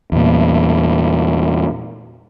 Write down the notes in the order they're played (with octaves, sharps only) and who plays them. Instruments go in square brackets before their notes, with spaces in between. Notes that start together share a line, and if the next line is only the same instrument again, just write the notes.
[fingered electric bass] E2 A#2